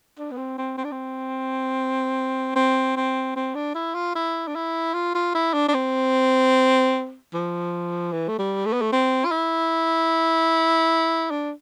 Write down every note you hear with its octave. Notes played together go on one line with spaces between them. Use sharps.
D4
B3
C4
C4
C4
D4
C4
C4
C4
C4
D4
E4
F4
E4
D4
E4
F4
F4
E4
D4
D4
C4
F3
E3
A3
G3
A3
B3
A3
C4
F4
E4
D4